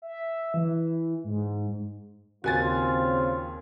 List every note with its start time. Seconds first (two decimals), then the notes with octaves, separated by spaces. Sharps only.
0.02 E5
0.54 E3
1.24 G#2
2.44 D#2 C#3 C4 F4 F#4 G#5 A6